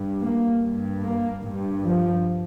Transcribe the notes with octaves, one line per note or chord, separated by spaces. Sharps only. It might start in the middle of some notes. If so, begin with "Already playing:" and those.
Already playing: G2
A#3
G2
A#3
G2
F3